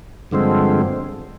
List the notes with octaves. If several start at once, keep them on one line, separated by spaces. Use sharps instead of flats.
G2 D3 F3 G#3 C4